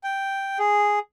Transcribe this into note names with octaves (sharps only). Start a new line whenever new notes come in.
G5
G#4